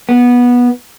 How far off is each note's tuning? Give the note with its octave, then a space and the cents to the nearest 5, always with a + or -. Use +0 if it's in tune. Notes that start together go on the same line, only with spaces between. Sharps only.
B3 -15